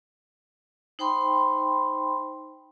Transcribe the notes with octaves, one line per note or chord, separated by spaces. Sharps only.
D#4 C5 G5 B5 C6